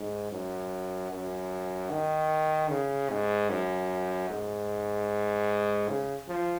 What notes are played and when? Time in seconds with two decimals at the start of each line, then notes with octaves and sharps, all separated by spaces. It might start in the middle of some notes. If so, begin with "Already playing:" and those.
Already playing: G#2
0.32 F#2
1.11 F#2
1.90 D#3
2.70 C#3
3.10 G#2
3.49 F#2
4.30 G#2
5.88 C#3
6.28 F3